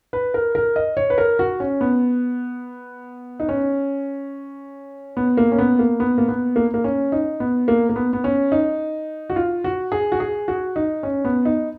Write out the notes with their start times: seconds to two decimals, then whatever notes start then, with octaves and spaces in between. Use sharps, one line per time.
0.13 B4
0.34 A#4
0.55 A#4
0.76 D#5
0.97 C#5
1.10 B4
1.18 A#4
1.39 F#4
1.60 C#4
1.81 B3
3.40 D#4
3.49 C#4
5.17 B3
5.37 A#3
5.52 C#4
5.58 B3
5.79 A#3
6.00 B3
6.18 A#3
6.28 B3
6.56 A#3
6.74 A#3
6.84 C#4
7.12 D#4
7.40 B3
7.68 A#3
7.89 A#3
7.96 B3
8.13 B3
8.24 C#4
8.52 D#4
9.30 F#4
9.36 F4
9.64 F#4
9.92 G#4
10.12 F#4
10.20 G#4
10.48 F#4
10.76 D#4
11.03 C#4
11.25 B3
11.45 D#4